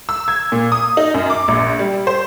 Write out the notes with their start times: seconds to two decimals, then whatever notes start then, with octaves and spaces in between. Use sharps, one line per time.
0.09 E6
0.28 G#6
0.52 A#2
0.72 D#6
0.97 D#4
1.14 F#2
1.30 D6
1.48 A#1
1.79 G3
2.07 C5